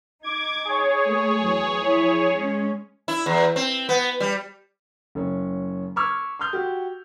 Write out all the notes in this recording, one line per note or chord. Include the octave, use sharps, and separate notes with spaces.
D#4 D6 G#6
G#4 C#5
A3 A#3
E2 F#3
F3 E4
G#3 C#4
E4
E2
C4
B3
G3
F#1 C#4
B5 C#6 D6 E6 F6 G#6
C6 D#6 F6 G6
F#4 G4